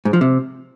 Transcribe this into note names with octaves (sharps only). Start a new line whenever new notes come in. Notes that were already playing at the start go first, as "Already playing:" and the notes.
G#2
F3
C3